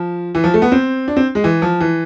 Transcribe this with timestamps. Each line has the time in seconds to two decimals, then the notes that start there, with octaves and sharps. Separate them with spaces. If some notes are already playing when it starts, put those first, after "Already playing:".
Already playing: F3
0.35 E3
0.44 F3
0.54 A3
0.62 B3
0.72 C4
1.08 D4
1.16 C4
1.35 G#3
1.44 E3
1.62 F3
1.80 E3